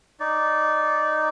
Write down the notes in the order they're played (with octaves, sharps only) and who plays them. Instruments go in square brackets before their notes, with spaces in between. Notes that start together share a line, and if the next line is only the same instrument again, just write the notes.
[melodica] D#4 D5